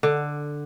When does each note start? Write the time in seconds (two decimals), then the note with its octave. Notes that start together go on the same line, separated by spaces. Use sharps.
0.03 D3